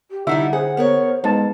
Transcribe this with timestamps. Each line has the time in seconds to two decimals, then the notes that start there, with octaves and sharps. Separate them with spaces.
0.11 G4
0.27 D3 G3 D#4 E4 E5 F#5
0.53 G#4 C5 F#5
0.77 B3 A#4 C#5
1.24 F2 G#3 B3 D#4 A5